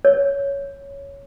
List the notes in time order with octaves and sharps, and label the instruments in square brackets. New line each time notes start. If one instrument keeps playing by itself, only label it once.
[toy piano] C#5